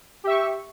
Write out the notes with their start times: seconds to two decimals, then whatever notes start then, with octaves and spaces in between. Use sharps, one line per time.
0.24 G4
0.27 E5
0.30 C#6